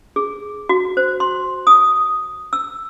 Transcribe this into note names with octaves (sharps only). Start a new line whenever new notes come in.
G#4
F#4
C5
C6
D#6
E6